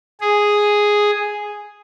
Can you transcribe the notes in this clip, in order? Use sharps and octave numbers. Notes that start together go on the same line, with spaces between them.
G#4